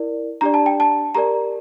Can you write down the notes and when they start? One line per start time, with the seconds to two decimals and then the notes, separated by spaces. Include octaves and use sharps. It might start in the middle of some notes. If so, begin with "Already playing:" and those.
Already playing: E4 A#4 D5
0.41 D4 G4 D5 A#5
0.54 A5
0.66 G5
0.80 A5
1.15 G4 A#4 D5 A#5